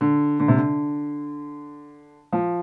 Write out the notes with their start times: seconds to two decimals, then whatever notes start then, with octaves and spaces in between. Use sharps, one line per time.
0.01 D3
0.40 D3
0.48 C3
0.56 D3
2.32 F3